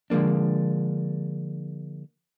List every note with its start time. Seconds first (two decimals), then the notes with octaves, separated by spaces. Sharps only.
0.10 D3 F3 G#3 A#3 D4